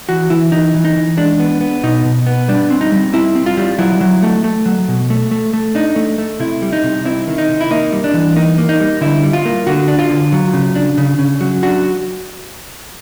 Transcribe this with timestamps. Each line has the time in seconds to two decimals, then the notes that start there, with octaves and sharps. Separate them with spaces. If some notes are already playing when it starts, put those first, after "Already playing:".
0.09 E3 F#4
0.30 E3 E4
0.52 E3 D#4
0.75 E3
0.85 D#4
0.96 E3
1.17 G#3 D4
1.40 B3
1.61 B3
1.83 B2 D#4
2.05 B2
2.26 B3
2.48 G3 D4
2.70 C4
2.81 D#4
2.92 G3
3.13 C4 E4
3.35 C4
3.46 F4
3.57 G3
3.79 F#3 E4
4.01 F#3
4.23 A3
4.44 A3
4.66 F#3
4.88 B2
5.10 A3
5.31 A3
5.54 A3
5.75 D4 D#4
5.96 A3
6.18 A3
6.40 C3 E4
6.62 G3
6.72 D#4
6.84 C3
7.05 C4 E4
7.27 D#3
7.38 D#4
7.49 C3
7.61 E4
7.71 A#3 D#4
7.93 G3
8.04 D4
8.14 E3
8.36 A#3 D#4
8.58 A#3
8.69 D#4
8.80 G3
9.01 D3 E4
9.23 G3
9.33 F4
9.45 A#3
9.67 D3 F#4
9.88 D4
9.99 F4
10.10 D3
10.32 F#3
10.53 C#3
10.76 D4
10.98 C#3
11.19 C#3
11.41 F#3
11.63 D4 F#4